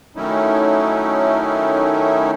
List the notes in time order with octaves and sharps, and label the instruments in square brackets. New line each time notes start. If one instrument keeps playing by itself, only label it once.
[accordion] D#3 F#3 A3 C#4 D#4 E4